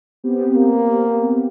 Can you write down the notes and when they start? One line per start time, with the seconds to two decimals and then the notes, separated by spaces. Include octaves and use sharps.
0.24 B3 C4 G4
0.55 A#3